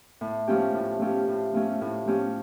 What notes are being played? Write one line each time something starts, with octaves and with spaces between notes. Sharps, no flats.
A2
F3 A3 C#4 G4
A2
F3 A3 C#4 G4
A2
F3 A3 C#4 G4
A2
F3 A3 C#4 G4